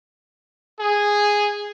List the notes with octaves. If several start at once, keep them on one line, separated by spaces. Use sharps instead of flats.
G#4